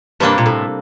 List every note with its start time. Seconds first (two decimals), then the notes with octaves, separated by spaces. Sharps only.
0.20 G2 C3 G3 A#3 D4
0.38 A#2
0.46 A2